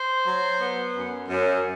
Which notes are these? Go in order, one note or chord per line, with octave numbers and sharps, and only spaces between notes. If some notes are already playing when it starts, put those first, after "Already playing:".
Already playing: C5
F#3
B3
F#2
F#2